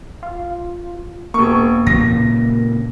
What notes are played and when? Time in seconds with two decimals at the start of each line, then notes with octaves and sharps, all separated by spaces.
0.23 F4
1.34 E1 A#3 C#6
1.87 A#2 C#3 E3 A#6